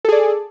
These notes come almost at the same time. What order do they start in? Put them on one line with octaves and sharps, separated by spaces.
A4 G#4 D5